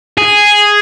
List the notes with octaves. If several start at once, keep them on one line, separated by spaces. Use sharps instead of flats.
G#4